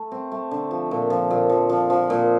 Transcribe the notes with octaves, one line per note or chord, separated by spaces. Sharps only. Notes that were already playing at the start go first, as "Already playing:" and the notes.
Already playing: A3
C4
A3
D3
F3
A#2
F3
A#2
F3
F3
F3
A#2